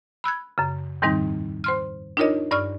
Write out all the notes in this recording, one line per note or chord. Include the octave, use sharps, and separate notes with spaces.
B5 E6 F#6 G#6
F#2 C#3
E2 G#2 D#3 G3 C4 D#4
C5 C6 F6
D4 D#4 F4 A#4 C#5 D#5
G2 D5 C#6 F6